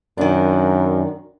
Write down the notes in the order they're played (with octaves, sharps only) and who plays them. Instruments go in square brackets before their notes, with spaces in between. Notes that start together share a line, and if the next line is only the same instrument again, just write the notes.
[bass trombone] F#2 [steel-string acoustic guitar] D#3 D4